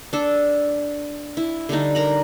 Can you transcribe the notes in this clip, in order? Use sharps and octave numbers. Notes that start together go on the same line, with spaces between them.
D4 A4
E4
D3 G3 D4 D#4
A#4 A#5 B5